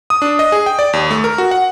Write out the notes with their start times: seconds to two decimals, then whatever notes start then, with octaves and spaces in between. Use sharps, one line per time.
0.10 D#6
0.22 D4
0.39 D#5
0.52 G#4
0.66 G5
0.79 D5
0.93 D#2
1.11 A3
1.24 A#4
1.38 F#4
1.51 F#5